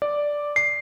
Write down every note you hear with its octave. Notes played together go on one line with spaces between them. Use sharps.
D5
C7